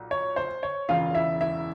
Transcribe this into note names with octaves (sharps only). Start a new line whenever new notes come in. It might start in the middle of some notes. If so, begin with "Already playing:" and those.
Already playing: B1 A#2
C#5
C5
C#5
E1 E2 C#3 F4 F5
E4 E5
E4 E5